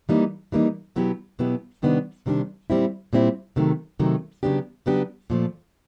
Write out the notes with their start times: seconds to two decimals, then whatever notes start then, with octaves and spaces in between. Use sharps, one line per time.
0.09 E3 G3 A#3 D#4
0.52 E3 G3 A#3 D#4
0.96 B2 F#3 B3 E4 G4
1.39 B2 F#3 B3 E4 G4
1.82 C3 D#3 G3 B3 D4
2.26 C3 D#3 G3 B3 D4
2.70 A#2 G3 C4 E4
3.13 A#2 G3 C4 E4
3.56 C3 D#3 F#3 A3
3.99 C3 D#3 F#3 A3
4.43 C#3 F#3 B3 D4 G4
4.86 C#3 F#3 B3 D4 G4
5.30 A#2 F3 A3